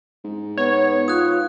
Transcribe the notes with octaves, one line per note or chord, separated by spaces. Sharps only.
G#2
B3 C#5
F4 D#6 F#6